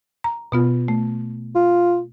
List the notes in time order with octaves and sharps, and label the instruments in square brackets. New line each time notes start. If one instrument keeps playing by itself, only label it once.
[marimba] A#5
B2 B3 F4
A3
[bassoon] F4